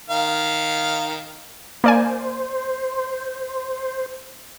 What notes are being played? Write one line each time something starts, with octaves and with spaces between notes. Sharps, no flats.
D#3 F5
A#3 C5 D5 G#5